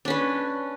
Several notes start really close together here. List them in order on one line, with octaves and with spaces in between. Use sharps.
D4 C#4 B4